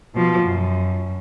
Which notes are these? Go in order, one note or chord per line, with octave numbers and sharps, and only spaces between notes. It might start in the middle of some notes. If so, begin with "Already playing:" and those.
B2 F3
F#2